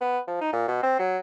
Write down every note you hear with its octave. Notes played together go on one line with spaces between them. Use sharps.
B3
F3
D#4
A#2
B2
C4
F#3